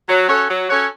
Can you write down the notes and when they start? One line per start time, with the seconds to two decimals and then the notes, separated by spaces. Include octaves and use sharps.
0.09 F#3
0.29 C#4 F#4 A4 C#5
0.49 F#3
0.70 C#4 F#4 A4 C#5